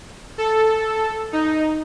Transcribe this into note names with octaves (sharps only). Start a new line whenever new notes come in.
A4
D#4